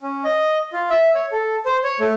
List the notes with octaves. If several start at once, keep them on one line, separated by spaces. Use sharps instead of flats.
C#4
D#5
F4
E5
C#5
A4
C5
C#5
A3